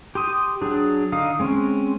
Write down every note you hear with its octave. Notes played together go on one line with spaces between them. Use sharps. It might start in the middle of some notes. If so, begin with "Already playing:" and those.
G4 C6 D#6
F#3 D4 G#4
D3 D#4 F5 D#6
G#3 C4 C#4